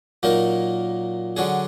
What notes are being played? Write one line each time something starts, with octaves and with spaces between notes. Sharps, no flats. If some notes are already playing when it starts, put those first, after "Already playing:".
A#2 F#3 A#3 D#4 A#4
D3 F#3 D4 G#4